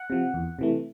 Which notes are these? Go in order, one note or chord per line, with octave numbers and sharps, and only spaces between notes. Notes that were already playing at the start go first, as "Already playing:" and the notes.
Already playing: F#5
C3 F3
E2
C3 E3 A3